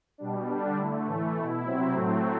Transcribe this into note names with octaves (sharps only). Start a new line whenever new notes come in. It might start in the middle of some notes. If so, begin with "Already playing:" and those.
B2 G3 D4
D3 G3 D4
D3 A3 E4
A2 E3 A3
B2 A3 E4
C3 F#3 C4 E4
A2 F#3 A3 C4